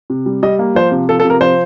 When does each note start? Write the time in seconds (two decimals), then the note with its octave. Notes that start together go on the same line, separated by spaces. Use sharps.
0.10 C3
0.26 G3
0.43 G3 D#5
0.59 A#3
0.75 F3 C5
0.92 C3
1.09 F3 A4
1.20 A4
1.25 C3
1.30 A#4
1.41 F3 C5